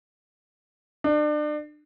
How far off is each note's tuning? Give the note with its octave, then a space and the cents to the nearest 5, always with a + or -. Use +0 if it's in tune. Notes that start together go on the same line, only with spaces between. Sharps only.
D4 +35